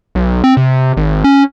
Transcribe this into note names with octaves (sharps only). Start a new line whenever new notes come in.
B1
C4
C3
G#1
C#4